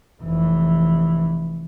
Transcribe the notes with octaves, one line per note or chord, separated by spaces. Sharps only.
F1 E3